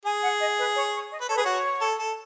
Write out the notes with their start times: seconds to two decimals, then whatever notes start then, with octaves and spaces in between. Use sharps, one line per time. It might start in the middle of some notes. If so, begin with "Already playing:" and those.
0.05 G#4 G#5
0.23 F#5
0.40 D#5
0.58 B4
0.75 C#5
0.93 C#5
1.11 D#5
1.21 B4
1.28 A4 C#5
1.37 G#4 B4
1.44 F#4 C#5
1.81 A4
1.99 A4